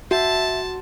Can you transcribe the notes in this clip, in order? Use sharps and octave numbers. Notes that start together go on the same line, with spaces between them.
F#4 E5 A5